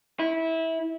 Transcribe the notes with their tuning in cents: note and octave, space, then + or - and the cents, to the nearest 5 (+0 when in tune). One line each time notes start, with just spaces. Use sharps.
E4 -20